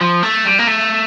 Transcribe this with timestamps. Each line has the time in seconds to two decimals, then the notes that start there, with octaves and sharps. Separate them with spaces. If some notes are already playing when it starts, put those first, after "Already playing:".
0.01 F3
0.23 A3
0.45 G3
0.59 A#3
0.67 A3